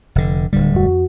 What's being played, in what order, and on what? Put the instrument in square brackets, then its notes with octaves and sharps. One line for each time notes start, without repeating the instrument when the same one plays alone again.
[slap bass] F1 D3
[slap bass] D1 G3 [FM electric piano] D3
[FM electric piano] F2 F#4